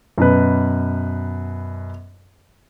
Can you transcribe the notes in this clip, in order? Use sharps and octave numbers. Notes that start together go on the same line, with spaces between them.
F#2 B2 B4